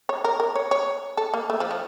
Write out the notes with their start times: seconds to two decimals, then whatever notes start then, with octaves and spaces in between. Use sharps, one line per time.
0.09 C#5
0.24 A#4
0.40 A#4
0.56 C#5
0.71 C#5
1.17 A4
1.34 A#3
1.50 A3
1.60 F3
1.71 F3